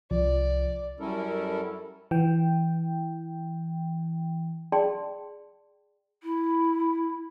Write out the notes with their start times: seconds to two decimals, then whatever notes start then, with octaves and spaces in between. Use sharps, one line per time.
0.11 C2 F3 D5
1.00 F#2 G3 C#4 E4 A4 A#4
2.11 E3 G5
4.72 G#4 D5 G5 A5 C6
6.23 E4